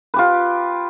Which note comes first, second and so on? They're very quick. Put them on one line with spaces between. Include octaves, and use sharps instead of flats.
B4 G4 F4